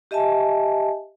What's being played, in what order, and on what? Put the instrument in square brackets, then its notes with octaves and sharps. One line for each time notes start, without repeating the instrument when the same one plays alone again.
[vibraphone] G4 D#5 E5 G#5 A5